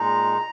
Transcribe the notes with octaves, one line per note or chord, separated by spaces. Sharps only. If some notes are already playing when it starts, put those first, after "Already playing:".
Already playing: A#2 G#3 D#4 A#5